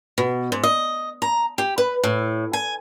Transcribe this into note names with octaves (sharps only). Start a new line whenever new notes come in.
B2
G#2
D#5
A#5
G4
B4
A2
G#5